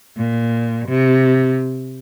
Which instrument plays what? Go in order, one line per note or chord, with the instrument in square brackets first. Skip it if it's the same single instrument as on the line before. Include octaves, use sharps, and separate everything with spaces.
[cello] A#2
C3